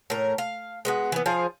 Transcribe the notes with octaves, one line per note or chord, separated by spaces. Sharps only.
A2 A#4
F5
G#3 B3 F#4
E3 B3
F3 G#4 F5